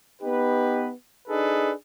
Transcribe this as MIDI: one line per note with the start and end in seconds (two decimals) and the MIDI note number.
0.22 0.90 59
0.22 0.90 63
0.22 0.90 67
0.22 0.90 71
1.28 1.72 62
1.28 1.72 63
1.28 1.72 68
1.28 1.72 69
1.28 1.72 71